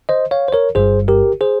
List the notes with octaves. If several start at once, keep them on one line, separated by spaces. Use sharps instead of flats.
C5 D#5
C#5 F5
C5
A#4 C#5
G1 G2 G3 G#4 C5
G4 A#4
G#4 C5